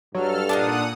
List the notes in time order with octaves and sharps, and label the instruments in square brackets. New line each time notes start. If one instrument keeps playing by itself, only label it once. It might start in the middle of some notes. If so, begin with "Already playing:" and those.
[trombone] G2 [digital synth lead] F#3 [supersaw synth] A4 F6
[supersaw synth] A#2 F#5 D#6 [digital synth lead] D4 [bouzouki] D#4 F4 A5